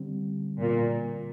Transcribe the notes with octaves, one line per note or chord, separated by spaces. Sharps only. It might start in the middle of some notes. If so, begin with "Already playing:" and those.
Already playing: D3 G3 C4
A#2